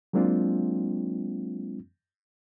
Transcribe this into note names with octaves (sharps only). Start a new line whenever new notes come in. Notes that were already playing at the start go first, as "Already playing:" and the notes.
F#3 G#3 A#3 C4 D4 F4